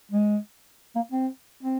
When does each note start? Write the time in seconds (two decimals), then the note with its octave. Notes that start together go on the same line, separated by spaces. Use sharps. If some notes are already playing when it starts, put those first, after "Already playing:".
0.11 G#3
0.95 A#3
1.12 C4
1.63 C4